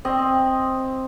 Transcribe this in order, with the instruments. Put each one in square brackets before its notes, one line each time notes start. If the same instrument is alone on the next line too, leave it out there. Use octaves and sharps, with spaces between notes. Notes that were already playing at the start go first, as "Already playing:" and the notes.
[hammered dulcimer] C4 D#5